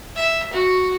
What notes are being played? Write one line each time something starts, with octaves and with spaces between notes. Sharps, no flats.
E5
F#4